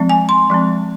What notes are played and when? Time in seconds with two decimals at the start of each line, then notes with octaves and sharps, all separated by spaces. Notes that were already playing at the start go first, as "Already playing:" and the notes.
Already playing: F3 G#3 C4
0.09 G#5
0.29 C6
0.50 F3 G#3 C4